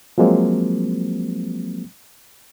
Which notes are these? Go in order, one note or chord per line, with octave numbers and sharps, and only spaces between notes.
F3 F#3 G#3 A#3 C4